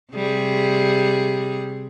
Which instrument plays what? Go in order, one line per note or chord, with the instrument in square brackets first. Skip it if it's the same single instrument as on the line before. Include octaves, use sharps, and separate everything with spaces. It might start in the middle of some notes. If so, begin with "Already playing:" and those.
[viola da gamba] C3 G3 G#4